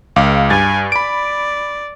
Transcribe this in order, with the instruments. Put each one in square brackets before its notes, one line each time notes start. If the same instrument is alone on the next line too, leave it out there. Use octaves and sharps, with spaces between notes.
[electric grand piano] C#2 F5 D6
[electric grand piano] G2 A6 [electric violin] G#5
[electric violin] D5 [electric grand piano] B5 D7